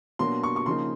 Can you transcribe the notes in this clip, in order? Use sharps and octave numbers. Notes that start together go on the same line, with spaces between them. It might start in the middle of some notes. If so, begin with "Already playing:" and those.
B2 F#3 A#3 D4 C6
C#6
C#6
C#3 F3 A#3 D#4 C6